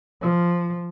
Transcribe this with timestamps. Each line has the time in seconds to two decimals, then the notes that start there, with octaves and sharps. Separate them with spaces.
0.22 F3